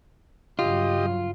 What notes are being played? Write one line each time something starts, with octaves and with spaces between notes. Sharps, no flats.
G2 C#3 F#3 F4 G4 D#5